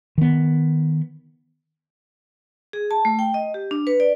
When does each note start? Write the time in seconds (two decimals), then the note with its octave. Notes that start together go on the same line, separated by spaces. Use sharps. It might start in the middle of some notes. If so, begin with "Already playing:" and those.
0.18 D#3 B3
2.73 G#4
2.91 A5
3.05 A3
3.19 G5
3.34 D#5
3.54 G4
3.71 D4
3.87 B4
4.00 D5